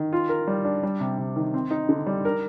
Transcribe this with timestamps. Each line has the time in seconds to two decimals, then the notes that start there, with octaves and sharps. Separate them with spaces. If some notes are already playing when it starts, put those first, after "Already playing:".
Already playing: D#3
0.13 F4
0.29 A#4
0.47 G3
0.65 D4
0.83 G3
1.00 C3
1.18 C3
1.36 D#3
1.54 C4
1.71 D#4
1.89 D3
2.07 G3
2.25 A#4